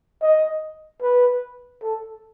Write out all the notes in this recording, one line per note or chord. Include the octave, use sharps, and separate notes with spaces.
D#5
B4
A4